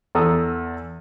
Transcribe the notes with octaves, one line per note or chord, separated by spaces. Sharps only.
E2 A4 A#5 D#6